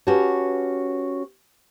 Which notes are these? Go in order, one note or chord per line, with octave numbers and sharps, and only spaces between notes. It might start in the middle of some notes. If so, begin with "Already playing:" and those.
C#4 F#4 G4 B4 C#5 A5